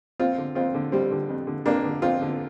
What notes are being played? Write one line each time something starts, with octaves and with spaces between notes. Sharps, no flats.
F2 C4 F4
D3
F2 C4 F4
D3
F2 G3 C4
D3
F2
D3
F2 A#3 D4
D3
F2 C4 F4
D3